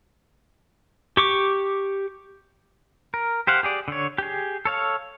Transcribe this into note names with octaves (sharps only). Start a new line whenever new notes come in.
G4 C#6 D6
A#4
G4 C5 F5 F#5
G4 G#4 D5
D3 C#5
G4 G#4
A4 C#5 F5